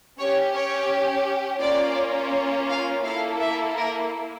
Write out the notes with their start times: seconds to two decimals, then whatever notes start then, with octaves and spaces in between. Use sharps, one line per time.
0.19 C#4 G4 C#5
0.54 C#5
1.61 A#3 C#4 F4 D5
2.69 F5
3.04 A#3 E4 A4 F5
3.40 E5
3.76 A#4